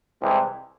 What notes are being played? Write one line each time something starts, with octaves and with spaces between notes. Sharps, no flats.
C2 C3 E3 G#3 C4